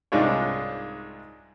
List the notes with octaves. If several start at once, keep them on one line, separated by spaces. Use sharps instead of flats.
C2 G#2 G#3 D4 F4 C#5